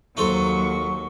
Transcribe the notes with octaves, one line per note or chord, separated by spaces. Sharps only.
D#2 F#3 D#4 A4 C5 C#6